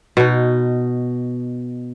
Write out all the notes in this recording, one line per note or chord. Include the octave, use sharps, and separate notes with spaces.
B2 D#4